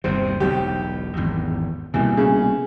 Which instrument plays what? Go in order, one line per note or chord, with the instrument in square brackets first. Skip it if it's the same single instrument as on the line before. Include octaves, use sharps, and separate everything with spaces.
[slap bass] G1 D#2 C3 [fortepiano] C4
[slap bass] E1 B1 F#3 [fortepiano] G4
[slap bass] G#1 E2
[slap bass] C2 B2 A#3 [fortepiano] E3
[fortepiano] C#3